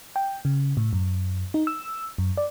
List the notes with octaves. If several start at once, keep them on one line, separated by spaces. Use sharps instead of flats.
G5
C#3
A2
F#2
D#4
E6
F#2
D5